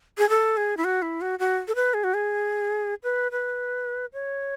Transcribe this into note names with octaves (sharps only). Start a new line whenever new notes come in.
G#4
A4
G#4
E4
F#4
E4
F#4
F#4
A4
B4
G#4
F#4
G#4
B4
B4
C#5